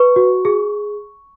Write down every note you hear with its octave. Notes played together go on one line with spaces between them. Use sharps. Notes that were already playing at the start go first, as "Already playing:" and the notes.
Already playing: B4 C#6
F#4
G#4